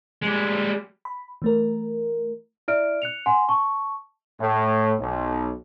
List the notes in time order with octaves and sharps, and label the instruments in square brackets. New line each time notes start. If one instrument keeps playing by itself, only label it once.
[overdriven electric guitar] G3 G#3
[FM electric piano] B5
E3 A3 A#4
[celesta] E4 D5 E5 F6 D7
F#6 C#7 F7
F#5 G#5 C6
A5 C#6
[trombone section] A2
B1